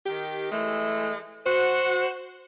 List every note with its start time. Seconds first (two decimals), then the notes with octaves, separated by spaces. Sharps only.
0.06 D#3 G4
0.51 E3 G#3 A3
1.45 F#4 C5